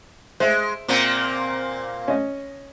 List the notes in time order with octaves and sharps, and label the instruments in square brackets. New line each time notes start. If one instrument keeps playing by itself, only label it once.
[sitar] G#3 [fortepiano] C5 E5
[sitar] A#2 A#3 C4
[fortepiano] C#4 D#5